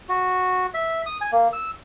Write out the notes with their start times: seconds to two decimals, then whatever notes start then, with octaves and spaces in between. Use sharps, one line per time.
0.09 F#4
0.74 E5
1.06 D#6
1.21 G#5
1.32 A#3
1.53 E6